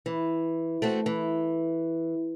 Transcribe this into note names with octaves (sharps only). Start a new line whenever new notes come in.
E3
A3 C4 F#4
E3